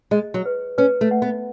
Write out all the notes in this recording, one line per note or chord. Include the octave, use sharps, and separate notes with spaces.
G#3 D#5
F#3
B4
C#4 B4
A3
F#5
B3